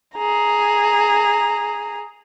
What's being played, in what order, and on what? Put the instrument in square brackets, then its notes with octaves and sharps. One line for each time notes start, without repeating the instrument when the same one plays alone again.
[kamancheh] G#4 A#5